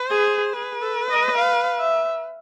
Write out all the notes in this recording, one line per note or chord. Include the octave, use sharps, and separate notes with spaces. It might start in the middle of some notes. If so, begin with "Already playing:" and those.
Already playing: C5
G#4
G#4 B4
A4
D#5
F5
E5